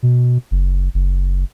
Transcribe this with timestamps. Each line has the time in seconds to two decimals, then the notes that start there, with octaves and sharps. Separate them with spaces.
0.03 B2
0.51 F#1
0.94 F#1